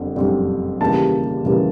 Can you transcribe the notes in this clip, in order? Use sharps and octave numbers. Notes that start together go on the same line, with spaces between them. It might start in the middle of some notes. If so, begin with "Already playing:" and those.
Already playing: F#1 F2 D3 G3
F#1 F2 D3 G3
D#2 C#3 E3 G3 A#3 A5
D#2 C#3 E3 G3 A#3